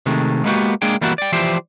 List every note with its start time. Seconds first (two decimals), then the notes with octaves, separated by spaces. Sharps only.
0.06 C3 D#3 G#3 A3
0.45 G#3 A#3 B3 C#4 F#4 G4
0.82 G#3 A#3 D4 G#4 G5
1.01 E3 G3 A#3 B3 E4 F#4
1.18 D5 G5
1.32 E3 F3 G4 C5 D5 E5